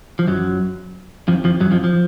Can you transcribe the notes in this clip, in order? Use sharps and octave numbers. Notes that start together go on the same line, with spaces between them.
F3
F#2 F#3
F2 F3
F2 F3
F#2 F#3
F2 F3
F3